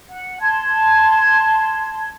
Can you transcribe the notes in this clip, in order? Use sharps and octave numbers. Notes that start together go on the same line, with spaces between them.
F#5
A5 C6 G#6